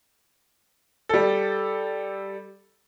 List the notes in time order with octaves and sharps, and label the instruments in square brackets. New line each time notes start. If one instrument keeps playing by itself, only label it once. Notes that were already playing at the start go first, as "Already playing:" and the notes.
[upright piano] G3 A4